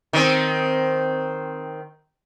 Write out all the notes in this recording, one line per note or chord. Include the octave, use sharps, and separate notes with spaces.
D#3 C4